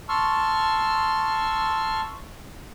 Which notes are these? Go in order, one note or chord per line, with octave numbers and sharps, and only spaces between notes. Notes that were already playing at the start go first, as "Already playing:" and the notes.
A5 C6 C#6 E6 F6